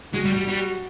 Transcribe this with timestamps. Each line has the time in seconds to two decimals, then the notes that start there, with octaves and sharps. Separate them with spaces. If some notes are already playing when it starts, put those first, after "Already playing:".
0.14 G#3 F#4
0.25 G3
0.36 G3
0.48 G3 F#4